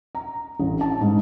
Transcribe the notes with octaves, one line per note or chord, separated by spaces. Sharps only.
A#5
A1
A5
G#2